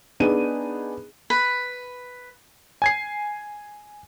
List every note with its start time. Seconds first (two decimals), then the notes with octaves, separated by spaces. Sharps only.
0.20 B3 D4 D#4 G#4 D#7
1.30 B4
2.82 G#5 G#6 C7